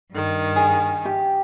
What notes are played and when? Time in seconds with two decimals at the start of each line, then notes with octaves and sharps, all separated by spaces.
0.11 G2 D#3
0.56 G#4
1.05 G4